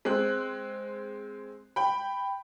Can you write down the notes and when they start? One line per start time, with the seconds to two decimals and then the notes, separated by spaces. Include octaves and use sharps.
0.05 G#3 C4 F#6
1.76 G5 B5